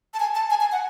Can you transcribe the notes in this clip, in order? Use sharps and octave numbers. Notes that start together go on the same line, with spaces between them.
A5
G#5
A5
G#5
G#5
F#5